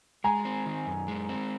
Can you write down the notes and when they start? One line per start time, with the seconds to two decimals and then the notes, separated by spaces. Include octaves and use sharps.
0.24 G#3 G#5 A#5
0.45 C4
0.66 D#3
0.86 F#2
1.08 G#3
1.29 C4